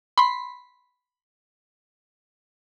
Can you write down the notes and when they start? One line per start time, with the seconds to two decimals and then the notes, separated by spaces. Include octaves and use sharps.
0.18 B5 C6